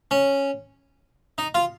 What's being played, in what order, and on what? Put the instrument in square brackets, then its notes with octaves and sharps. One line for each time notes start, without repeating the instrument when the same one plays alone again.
[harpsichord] C#4
D#4
F4